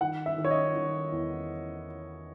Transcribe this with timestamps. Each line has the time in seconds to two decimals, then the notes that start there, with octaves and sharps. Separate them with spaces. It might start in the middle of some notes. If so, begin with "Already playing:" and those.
0.01 D#3 F#5
0.26 E5
0.38 D#3
0.45 C#5
0.50 D#5
0.75 D#3
1.12 E2